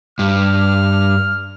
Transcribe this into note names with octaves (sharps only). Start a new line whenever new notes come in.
G2 F6